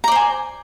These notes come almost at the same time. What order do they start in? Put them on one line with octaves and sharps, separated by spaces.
A#5 D5 C5 G#5